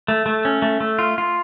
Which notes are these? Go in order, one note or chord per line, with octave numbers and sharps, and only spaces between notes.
A3
A3
C#4
A3
A3
F4
F4